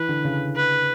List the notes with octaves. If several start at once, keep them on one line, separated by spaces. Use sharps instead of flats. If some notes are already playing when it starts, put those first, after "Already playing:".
Already playing: E3 B4
D3
C#3
B4